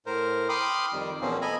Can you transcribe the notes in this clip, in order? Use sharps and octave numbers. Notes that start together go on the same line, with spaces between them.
A2 A#4 C5
G5 B5 C6 D6 D#6 F6
F2 D#3 G3
E2 B2 F3 A#3 C4 C#4
A4 D#5 G#5 A#5 B5